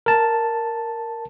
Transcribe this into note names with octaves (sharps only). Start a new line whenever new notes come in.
A#4 A5